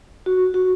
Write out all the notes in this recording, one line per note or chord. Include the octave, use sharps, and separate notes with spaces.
F#4
F#4